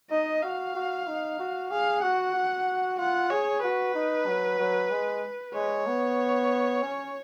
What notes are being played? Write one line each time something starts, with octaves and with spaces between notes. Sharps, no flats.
D#4 D#5
F#4 F5
F#4
D#4
F#4
G#4 F5
F#4 F#5
F#4
F4 F#5
G#4 C#5
F#4 B4
D#4
F#3
F#3
G#3
G#3 C#5
B3
C#4